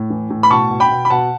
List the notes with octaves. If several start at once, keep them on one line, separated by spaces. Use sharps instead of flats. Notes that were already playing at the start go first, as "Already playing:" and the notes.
Already playing: A2
E3
A2
B5
B2 A5 C#6
B2
G5 B5
B2
B5
B2 F#5 A5